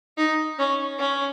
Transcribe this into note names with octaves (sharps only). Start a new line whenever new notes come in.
D#4
C#4
C#4